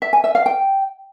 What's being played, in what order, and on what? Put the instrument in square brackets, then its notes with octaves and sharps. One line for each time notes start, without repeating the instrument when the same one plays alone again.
[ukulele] E5
G#5
E5
F5
G5